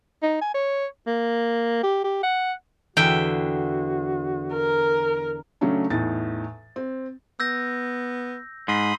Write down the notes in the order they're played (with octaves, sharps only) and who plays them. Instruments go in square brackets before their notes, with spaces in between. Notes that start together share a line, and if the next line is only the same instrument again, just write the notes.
[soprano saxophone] D#4
G#5
C#5
A#3
G4
G4
F#5
[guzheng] E2 D3 E5 [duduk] F#4 [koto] G5
[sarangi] A#4
[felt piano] C#3 F#3 A3 C#4 D4
E2 A2 D#4 A6
C4
[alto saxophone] B3 [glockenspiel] E6 G6 A#6
[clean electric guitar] G#2 [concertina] B5 C6 D#6